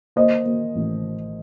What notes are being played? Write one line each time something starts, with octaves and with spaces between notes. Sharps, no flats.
A#3 C5 D#5
A#3
A1